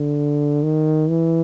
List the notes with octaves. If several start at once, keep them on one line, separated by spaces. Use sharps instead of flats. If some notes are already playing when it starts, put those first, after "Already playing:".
Already playing: D3
D#3
E3